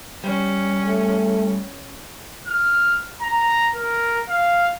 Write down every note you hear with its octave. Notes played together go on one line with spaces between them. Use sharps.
G3 C#4
A3
F6
A#5
A#4
F5